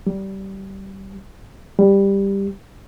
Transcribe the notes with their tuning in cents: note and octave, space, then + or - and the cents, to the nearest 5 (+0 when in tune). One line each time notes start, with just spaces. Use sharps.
G3 -20
G3 +10